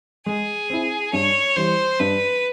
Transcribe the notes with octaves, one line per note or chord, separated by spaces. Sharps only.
G#3 G#4
C4 E4
G2 C#5
E3 G3 C5
G2 B4